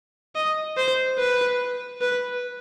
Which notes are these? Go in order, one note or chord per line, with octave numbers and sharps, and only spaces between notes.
D#5
C5
B4
B4